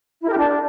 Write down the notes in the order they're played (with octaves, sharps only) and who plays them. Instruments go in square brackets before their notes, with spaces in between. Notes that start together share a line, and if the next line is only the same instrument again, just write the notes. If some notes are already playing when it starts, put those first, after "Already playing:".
[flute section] E4
A#4
G4
D4